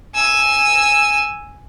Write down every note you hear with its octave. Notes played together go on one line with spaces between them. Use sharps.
G#5 E6